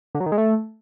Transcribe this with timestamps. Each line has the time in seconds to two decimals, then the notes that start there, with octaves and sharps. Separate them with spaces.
0.15 D3
0.20 F#3
0.26 D#3
0.32 G#3
0.38 A3